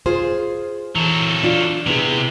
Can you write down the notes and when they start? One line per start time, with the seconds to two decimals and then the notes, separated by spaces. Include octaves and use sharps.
0.06 F4 G#4 C5
0.96 E3 F#3 A4
1.43 D4 F4
1.87 C3 B3 E4 G#4